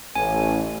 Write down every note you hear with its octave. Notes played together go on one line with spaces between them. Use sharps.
A1 G#5